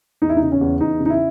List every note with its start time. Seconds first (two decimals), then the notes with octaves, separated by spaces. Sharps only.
0.22 E2 D#4
0.29 E4
0.37 D#4
0.42 C#3
0.52 C#4
0.61 E2
0.81 E2 D#4
1.00 C#3
1.06 D#4
1.10 E4